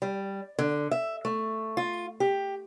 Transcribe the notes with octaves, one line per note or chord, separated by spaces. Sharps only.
G3
D3
E5
A3
F4
G4